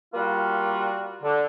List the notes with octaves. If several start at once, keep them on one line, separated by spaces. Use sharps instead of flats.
G3 A#3 F4 F#4
D3